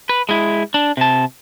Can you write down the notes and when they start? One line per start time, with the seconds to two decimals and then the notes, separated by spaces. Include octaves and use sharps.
0.09 B4
0.29 G#3 E4
0.74 D4
0.97 C3 A5